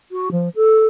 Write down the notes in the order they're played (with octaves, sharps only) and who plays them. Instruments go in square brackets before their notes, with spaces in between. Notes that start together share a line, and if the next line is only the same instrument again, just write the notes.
[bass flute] F#4
F3
A4